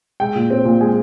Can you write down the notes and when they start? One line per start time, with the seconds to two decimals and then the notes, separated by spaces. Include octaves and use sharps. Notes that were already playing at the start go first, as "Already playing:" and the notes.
0.20 G#3 G5
0.35 A#2
0.50 C4
0.65 A#2
0.81 G#3 G#5